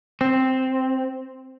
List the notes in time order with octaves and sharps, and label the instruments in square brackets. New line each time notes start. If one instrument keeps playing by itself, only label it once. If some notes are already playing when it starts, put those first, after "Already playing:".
[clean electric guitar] C4